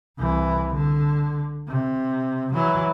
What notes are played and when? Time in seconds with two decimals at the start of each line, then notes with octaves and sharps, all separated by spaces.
0.19 C2 E3
0.75 D3
1.68 C3
2.54 E3 F#3